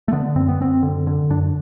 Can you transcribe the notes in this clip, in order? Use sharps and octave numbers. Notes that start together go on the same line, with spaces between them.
A3
D3 B3
F#2 C4
B3
F#2 C4
D3
D3
F#2 D4